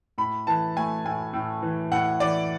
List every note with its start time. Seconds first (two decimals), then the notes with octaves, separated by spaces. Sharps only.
0.18 A2 B5
0.47 E3 A5
0.76 A3 G#5
1.05 A2 G#5
1.33 A2
1.62 E3
1.91 A2 F#5
2.20 E3 D5